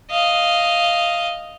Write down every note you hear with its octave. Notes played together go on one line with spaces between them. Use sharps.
D#5 F5